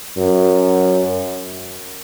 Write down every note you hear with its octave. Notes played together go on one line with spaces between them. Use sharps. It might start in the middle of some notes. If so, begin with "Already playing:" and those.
F#2